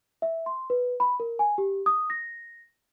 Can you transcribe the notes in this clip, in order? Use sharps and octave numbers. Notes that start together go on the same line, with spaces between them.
E5
C6
B4
B5
A#4
G#5
G4
D#6
A#6